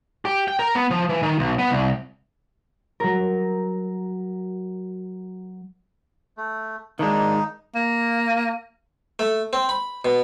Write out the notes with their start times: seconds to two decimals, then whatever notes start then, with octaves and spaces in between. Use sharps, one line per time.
0.25 G4
0.48 G5
0.59 A#4
0.75 B3
0.91 F3
1.09 E3
1.23 D#3
1.39 B1
1.59 B3
1.71 C2
3.00 F#3 A#4
6.37 A3
6.99 D#3 G#3 A#3 D4 D#4
7.75 A#3
9.19 A3
9.53 C4
9.69 B5
10.05 B2